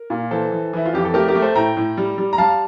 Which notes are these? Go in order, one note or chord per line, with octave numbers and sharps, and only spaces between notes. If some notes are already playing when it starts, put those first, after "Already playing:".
Already playing: A#4
A#2
E3 A4 C5
E3
E3 E4
F4
F2 G4
A4
A3 G4 A#4
G4 A#4
A3
A4 C5
A2 G5 A#5
A2
G3
G3
A#5
G3 F5 A5